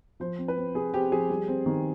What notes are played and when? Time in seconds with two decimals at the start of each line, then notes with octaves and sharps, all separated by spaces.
0.20 F3 C5
0.38 C4
0.48 B4
0.57 C4
0.74 C3 G#4
0.94 C4 G4
1.12 F3 G#4
1.30 G3
1.48 C4
1.66 D#3